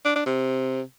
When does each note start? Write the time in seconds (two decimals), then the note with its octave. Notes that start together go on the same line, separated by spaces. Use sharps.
0.05 D4
0.16 D4
0.26 C3